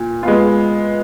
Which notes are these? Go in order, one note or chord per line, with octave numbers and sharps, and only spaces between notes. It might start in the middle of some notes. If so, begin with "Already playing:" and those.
Already playing: A#2
G#3 B3 F4